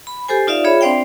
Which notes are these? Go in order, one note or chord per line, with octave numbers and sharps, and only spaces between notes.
B5
G4 A4 C5 G#5
D#4 F4 D5 E5 F5
F4 G#4 C#5 E5 B5
C4 D4 C5 D5 F5 G5